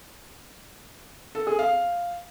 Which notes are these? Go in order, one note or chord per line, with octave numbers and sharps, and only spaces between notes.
A4
G#4
F5